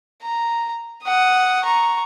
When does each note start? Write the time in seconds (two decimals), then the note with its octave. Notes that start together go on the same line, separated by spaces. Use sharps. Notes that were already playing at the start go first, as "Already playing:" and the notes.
0.22 A#5
1.03 F#5 D#6
1.64 A#5 C#6